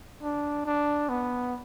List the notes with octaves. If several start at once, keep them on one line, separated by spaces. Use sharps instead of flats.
D4
D4
B3